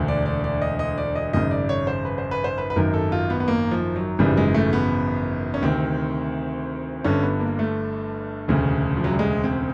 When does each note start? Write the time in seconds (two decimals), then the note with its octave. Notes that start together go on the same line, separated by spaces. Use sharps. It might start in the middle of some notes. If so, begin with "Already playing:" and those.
Already playing: E1 D2 D3
0.08 D5
0.26 D5
0.44 D5
0.62 D#5
0.79 D#5
0.98 D5
1.16 D#5
1.33 G#1 F#2 C#3 D#5
1.51 D5
1.69 C#5
1.87 C5
2.05 B4
2.18 C5
2.31 B4
2.44 C5
2.58 B4
2.70 B4
2.76 G#1 F#2 D#3 A#4
2.94 A4
3.12 F4
3.30 B3
3.40 B3
3.48 A#3
3.71 F3
3.96 F#3
4.19 G#1 F#2 C#3 E3 G3
4.37 G#3
4.54 A3
4.73 B3
5.54 C#4
5.62 D2 C3 D#3 C4
7.04 G1 G2 D3 C#4
7.23 B3
7.40 A#3
7.59 A3
8.48 E1 D2 C#3
8.97 F3
9.04 F#3
9.12 G3
9.19 G#3
9.44 C4